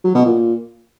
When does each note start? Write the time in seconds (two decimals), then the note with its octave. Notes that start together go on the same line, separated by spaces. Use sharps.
0.04 F#3
0.15 B2
0.26 A#2